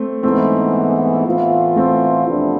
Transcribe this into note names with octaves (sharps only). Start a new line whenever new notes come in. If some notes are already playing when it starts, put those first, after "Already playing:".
Already playing: A3 C4
G#2 E3 G#3 A3 B3 C4
A2 E3 B3 F4
A3 C4
E2 C3 F3 B3 D4